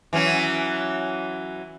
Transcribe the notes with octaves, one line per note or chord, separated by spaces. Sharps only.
E3 F#3 C#4